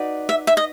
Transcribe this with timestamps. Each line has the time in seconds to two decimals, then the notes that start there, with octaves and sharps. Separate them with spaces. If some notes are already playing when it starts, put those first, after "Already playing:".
Already playing: D#4 F#4 B4 D5
0.29 E5
0.47 E5
0.57 D#5